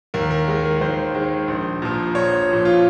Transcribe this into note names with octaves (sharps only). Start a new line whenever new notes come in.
D#2 A#4
A#4
D#3 G#3
A#4
D#2 C5
D#3 G#3
A#1
A#2 F3
A#1 C#5
A#2 F3
F4